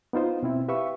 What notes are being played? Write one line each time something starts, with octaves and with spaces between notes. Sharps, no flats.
B3 D#4 F4 C5
B2 C4 E4
G4 B4 E5 F5 C#6